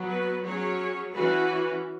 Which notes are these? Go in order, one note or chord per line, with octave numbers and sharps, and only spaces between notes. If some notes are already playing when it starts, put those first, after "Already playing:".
Already playing: F#3 B3
F#4 B4
F#3 C#4 G#4 C#5
E3 C#4 F#4 B4